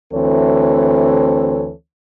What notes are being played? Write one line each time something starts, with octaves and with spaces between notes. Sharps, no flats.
D2 E3 C4 A4 C#5